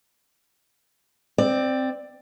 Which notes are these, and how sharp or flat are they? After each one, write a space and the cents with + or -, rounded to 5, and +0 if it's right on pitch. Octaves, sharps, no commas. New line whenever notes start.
C4 +0 D5 +15